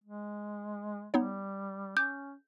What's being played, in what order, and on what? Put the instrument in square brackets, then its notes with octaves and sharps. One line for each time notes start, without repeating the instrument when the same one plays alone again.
[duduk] G#3
[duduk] G3 [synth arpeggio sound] B3 D#4 C#5
[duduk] C#4 [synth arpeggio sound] D6 [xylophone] G6